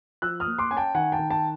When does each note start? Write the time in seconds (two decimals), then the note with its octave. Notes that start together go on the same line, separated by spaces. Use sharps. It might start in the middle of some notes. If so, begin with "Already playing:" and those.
0.22 F3 E6 F#6
0.40 D#6 F6
0.46 A#3
0.58 C6 D6
0.71 C#4 G#5
0.77 G5 A5
0.94 D#3 F#5 G#5
1.12 G5 A5
1.19 D#3
1.30 G5 A5